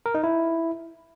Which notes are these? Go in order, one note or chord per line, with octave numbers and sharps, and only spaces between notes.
A#4
D#4
E4